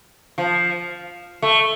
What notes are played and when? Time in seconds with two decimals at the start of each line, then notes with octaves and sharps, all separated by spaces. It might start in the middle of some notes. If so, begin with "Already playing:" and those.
0.38 F3
1.42 A3